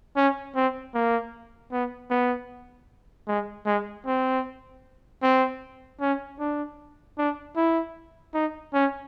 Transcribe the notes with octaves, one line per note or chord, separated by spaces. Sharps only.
C#4
C4
A#3
B3
B3
G#3
G#3
C4
C4
C#4
D4
D4
E4
D#4
C#4